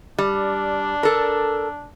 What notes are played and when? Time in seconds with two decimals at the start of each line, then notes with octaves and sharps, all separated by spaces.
0.18 G3 D4
1.03 A4 A#4